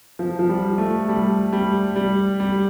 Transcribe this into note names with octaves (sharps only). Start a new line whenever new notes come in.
F3
F3
G3
A3
G3
G3
G3
G3